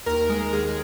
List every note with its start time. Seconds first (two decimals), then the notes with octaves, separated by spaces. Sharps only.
0.06 D#2 A#4
0.30 G#3
0.53 D#2 G#4